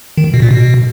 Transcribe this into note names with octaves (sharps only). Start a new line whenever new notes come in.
D#3
B2
A#2
B2